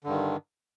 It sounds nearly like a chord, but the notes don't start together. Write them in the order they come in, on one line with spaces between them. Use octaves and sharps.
D3 G2 D#3